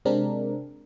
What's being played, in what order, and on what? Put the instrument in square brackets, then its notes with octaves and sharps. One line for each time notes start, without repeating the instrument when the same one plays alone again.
[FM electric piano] C3 G#3 C4 D4 A#4